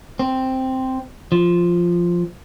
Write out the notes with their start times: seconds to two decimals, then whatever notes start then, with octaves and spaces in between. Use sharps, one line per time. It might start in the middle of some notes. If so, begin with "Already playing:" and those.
0.19 C4
1.32 F3